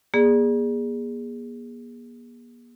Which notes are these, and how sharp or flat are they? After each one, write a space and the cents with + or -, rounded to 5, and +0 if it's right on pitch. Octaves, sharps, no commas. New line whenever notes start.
A#3 +45 G#4 -20 D5 +5